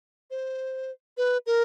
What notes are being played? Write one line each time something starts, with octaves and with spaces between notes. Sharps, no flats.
C5
B4
A#4